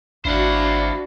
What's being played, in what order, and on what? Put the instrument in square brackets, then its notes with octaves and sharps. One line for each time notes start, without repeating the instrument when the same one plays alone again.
[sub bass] G#1 [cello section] D4 F#4 [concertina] E4 F5 [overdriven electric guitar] C5 F#5